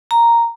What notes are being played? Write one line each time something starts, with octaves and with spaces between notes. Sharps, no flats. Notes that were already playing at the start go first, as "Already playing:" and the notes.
A#5